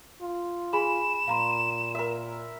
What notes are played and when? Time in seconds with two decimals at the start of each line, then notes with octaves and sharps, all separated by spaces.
0.22 F4
0.73 G#4 G#5 B5 E7
1.28 A#2 F5 A#5 C6
1.95 A#4 E5